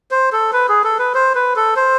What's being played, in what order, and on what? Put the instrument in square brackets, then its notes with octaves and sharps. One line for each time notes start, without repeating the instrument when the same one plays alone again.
[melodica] C5
A4
B4
G#4
A4
B4
C5
B4
A4
C5